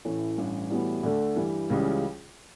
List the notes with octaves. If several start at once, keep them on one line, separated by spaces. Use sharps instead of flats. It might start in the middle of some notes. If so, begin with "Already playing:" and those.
A1 A2 E3 A3
A1 G2 E3
A2 E3 G3 B3 F#4
D2 D3 A3 D4
G2 E3 G3
C#2 C#3 E3 G3 C#4